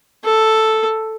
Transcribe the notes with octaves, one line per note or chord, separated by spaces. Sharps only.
A4